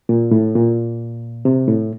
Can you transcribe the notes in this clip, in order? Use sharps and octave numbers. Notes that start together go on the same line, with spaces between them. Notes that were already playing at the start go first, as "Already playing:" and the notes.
A#2
A2
A#2
C3
A2